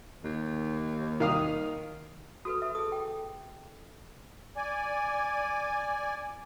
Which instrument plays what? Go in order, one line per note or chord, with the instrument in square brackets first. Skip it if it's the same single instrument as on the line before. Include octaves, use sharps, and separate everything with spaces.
[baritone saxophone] D#2
[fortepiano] D#3 F5 D#6
[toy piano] F#4 A4 B4 [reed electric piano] D#6
[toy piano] E5
[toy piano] G#4 D#6 [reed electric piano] A4
[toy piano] G5
[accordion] D5 G#5